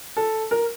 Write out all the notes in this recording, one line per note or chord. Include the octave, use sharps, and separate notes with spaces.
A4
A#4